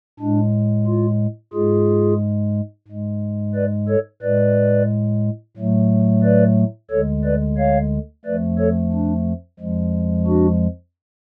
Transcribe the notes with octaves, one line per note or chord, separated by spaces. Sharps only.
A2 G#3 D4
F4
G#2 G#3 F4 G#4
G#2 G#3
B4 D5
A4 C#5
A2 G#3 B4 D5
A2 F#3 A3
B4 D5
D2 D3 G#3 A4 C#5
B4 D5
C#5 F5
F2 F3 A3 B4 D5
A4 C#5
D4
F2 F3 G#3
D4 F#4